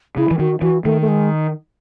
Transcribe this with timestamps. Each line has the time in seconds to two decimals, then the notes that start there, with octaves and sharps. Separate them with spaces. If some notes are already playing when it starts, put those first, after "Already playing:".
0.17 C#3 E4
0.31 E3
0.39 D#3 F#4
0.62 E3 F#4
0.84 D#3 A3
1.01 A3
1.08 G#3